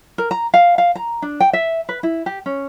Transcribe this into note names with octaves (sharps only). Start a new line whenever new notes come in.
A#4
A#5
F5
F5
A#5
D4
G5
E5
B4
E4
G4
C#4